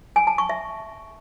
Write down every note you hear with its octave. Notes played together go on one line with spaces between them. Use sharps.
G#5
A5
C#6
E5